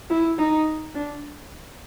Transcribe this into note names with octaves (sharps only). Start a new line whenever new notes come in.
E4
D#4
D4